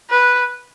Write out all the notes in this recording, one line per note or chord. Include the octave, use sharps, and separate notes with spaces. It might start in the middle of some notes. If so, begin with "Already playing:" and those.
B4